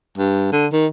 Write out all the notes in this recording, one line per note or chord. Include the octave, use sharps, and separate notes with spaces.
G2
D3
D#3